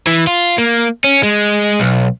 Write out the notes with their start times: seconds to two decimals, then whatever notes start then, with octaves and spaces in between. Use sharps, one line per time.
0.07 E3
0.27 F4
0.58 A#3
1.04 C#4
1.23 G#3
1.80 B1